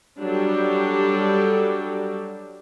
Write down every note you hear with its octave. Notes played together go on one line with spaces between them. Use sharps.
F#3 G3 D4 G4 A4